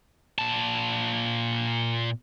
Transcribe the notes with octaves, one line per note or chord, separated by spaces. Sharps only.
A#2 A5